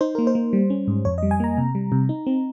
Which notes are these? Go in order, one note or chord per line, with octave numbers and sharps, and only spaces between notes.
D#4 C5
A#3 A#4
C5
A#3
G3
C#4
G#2
F2 C#5
D#5
G3
G#5
A#3 A#5
C3
G3
C3
D#4
C4